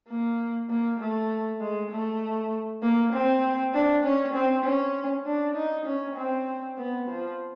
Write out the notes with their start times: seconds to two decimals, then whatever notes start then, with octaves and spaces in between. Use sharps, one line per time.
0.09 A#3
0.70 A#3
1.00 A3
1.61 G#3
1.91 A3
2.82 A#3
3.13 C4
3.74 D4
4.04 C#4
4.34 C4
4.64 C#4
5.26 D4
5.56 D#4
5.86 C#4
6.17 C4
6.77 B3
7.08 F3